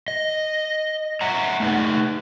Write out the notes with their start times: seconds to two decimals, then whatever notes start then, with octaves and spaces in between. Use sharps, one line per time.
0.08 D#5
1.21 E5 F#5 A#5
1.60 A3 D#4 B4